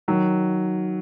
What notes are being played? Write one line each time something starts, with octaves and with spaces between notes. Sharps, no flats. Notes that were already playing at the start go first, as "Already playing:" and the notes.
D#3 F#3